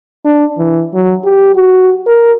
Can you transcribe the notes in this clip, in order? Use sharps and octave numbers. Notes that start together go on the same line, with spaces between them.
D4
E3
F#3
G4
F#4
A#4